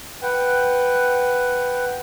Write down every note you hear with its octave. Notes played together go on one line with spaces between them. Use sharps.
B4 F#5 G5